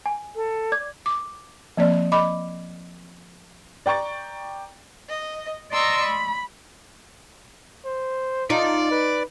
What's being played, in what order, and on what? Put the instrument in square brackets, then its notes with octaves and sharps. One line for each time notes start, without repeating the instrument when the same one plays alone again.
[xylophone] G#5
[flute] A4
[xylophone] D5 D6 G#6
[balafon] D6
F3 A#3 C4 D5
D#5 B5 D6
[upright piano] D5 G5 A#5 C#6 A6
[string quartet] D#5
D5 D#5 A#5 C6 C#6 E6
B5
[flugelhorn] C5
[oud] D#4 [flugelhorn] F4 [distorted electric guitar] D5
[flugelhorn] B4